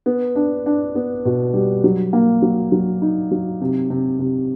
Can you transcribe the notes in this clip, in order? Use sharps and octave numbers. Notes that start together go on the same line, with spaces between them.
B3
D4
D4
B3
B2
G3
F#3
A#3
F#3
F#3
D#4
F#3
C3
C3
C3